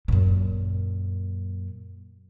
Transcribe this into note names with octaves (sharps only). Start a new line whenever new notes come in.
F#2 A#2